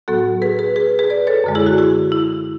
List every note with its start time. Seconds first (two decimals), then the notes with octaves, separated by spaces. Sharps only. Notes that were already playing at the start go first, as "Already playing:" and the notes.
0.08 A2 F#3 B3 F#4 A4
0.42 G#4 B4
0.59 G#4 B4
0.76 G#4 B4
0.99 G#4 B4
1.10 B4 D5
1.27 A4 C#5
1.44 F#2 D3 G#3
1.55 E4 G#4
1.66 F#4
1.78 E4 G#4
2.12 E4